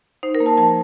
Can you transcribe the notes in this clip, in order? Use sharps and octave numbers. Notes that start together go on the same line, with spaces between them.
D#4 C5
A#4
A#3
A5
F3 A5